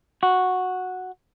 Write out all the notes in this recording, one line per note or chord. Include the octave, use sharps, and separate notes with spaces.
F#4